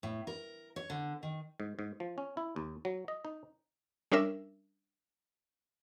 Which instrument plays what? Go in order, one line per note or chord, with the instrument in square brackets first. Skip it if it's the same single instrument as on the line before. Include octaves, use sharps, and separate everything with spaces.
[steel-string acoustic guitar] A2
A#4
C#5
D3
D#3
[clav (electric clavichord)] G#2
G#2
F3
C#4
E4
D#2
F#3
D#5
D#4
[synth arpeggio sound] G3 C#4 D4 A#4 E5 E6